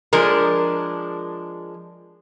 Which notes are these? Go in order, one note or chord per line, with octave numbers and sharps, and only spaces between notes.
F3 G#3 D4 A#4